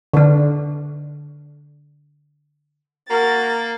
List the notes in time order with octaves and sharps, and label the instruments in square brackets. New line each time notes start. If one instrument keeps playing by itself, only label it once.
[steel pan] D3 D4
[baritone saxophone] A#3 [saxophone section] F#4 A#4 [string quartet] A6